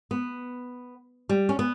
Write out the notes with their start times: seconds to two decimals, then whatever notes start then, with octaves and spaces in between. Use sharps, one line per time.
0.11 B3
1.29 G3
1.49 C#4
1.59 B3